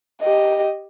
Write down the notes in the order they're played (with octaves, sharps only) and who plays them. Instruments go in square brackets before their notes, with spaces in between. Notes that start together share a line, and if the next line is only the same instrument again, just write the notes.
[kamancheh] G4 D#5